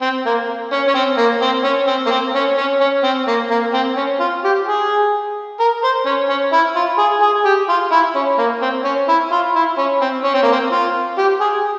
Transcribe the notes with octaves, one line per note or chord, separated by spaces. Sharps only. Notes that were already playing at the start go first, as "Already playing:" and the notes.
C4
A#3
C#4
C#4
C4
A#3
C4
C#4
C4
A#3
C4
C#4
C#4
C#4
C4
A#3
A#3
C4
C#4
F4
G4
G#4
A#4
C5
C#4
C#4
E4
F4
G#4
G#4
G4
F4
E4
C#4
A#3
C4
C#4
E4
F4
E4
C#4
C4
C#4
C4
A#3
C4
F4
G4
G#4